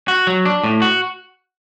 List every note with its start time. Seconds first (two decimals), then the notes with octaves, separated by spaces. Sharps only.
0.08 F#4
0.27 F#3
0.45 D4
0.64 A2
0.82 F#4